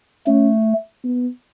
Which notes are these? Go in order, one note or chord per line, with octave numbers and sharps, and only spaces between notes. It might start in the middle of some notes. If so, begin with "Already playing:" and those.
A3 C#4
B3